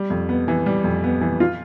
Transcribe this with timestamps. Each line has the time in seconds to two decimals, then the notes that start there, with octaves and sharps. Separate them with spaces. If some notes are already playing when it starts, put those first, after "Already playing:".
Already playing: G3
0.10 F2
0.29 B3
0.48 E3
0.66 G3
0.84 F2
1.04 B3
1.21 E3
1.40 F4